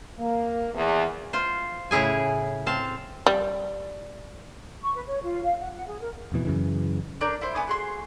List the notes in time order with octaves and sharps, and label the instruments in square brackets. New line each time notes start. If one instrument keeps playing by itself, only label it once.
[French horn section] A#3
E2
[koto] F4 C5
A2 C#3 E4 G#4 G#5
C4 F5 A5
[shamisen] G3
[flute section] C#6
B4
C#5
F4
F5
F#5
F#5
G#4
A#4
[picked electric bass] E1 F2 B2 E3
F#2 C#3 E3
[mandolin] D4 A#4 D5 G6
E4 C5
B3 G#5 D6 D#6
F#4 G#4 C6